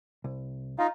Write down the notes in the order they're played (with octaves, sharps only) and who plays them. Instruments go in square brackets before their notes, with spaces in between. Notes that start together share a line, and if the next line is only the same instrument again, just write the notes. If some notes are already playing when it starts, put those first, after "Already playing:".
[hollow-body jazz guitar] C2
[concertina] D#4 F4 [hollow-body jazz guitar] F5 A#5